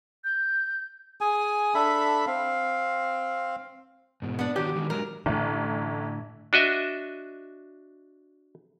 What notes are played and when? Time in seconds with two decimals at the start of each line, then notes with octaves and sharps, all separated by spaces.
0.24 G6
1.21 G#4 G#5
1.75 D4 A4 E5 B5
2.27 C4 F5
4.22 G#2 B2
4.39 B3 D4
4.56 D#3 F#4 G4 C#5
4.76 D#3 G#3 F#4
4.90 F#3 G#3 D4 A#4
5.26 A1 A2 D3
6.53 D4 F#4 D#5 E5